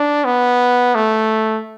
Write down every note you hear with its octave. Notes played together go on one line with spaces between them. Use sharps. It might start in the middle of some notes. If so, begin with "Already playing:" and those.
Already playing: D4
B3
A3